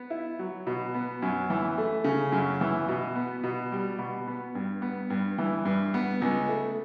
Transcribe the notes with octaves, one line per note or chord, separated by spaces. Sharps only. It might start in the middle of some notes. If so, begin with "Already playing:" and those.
Already playing: B3
E4
F#3
B2
B3
F#2
E3
A3
C#3
F#2
E3
B2
B3
B2
G3
B2
B3
G2
B3
G2
E3
G2
B3
C#2
A3